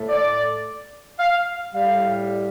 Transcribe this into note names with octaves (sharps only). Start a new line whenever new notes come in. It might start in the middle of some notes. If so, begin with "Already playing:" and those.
Already playing: A2 A3
D5
F5
A2 G3 F5